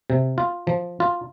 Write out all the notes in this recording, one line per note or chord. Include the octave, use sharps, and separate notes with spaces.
C3
F4
F3
F4